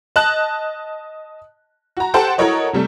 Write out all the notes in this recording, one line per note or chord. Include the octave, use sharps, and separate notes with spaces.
D#5 A5 F#6
F#4 A#5
G4 A4 C5 F#5 G5 A5
E4 F#4 A4 A#4 C#5 D#5
C3 G3 A3